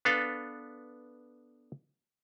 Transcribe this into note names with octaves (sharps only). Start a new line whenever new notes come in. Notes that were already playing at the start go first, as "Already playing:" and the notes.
B3 D4 A4 B4 F5